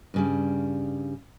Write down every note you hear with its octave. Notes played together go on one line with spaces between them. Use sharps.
G2 C#3 G3